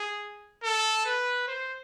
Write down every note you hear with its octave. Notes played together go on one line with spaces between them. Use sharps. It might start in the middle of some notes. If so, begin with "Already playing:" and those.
Already playing: G#4
A4
B4
C5